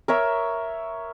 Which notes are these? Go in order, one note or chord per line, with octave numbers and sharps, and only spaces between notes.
A#4 C#5 E5